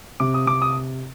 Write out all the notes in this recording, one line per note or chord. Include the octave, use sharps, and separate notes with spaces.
C3 D6
D#6
C3 D6
D#6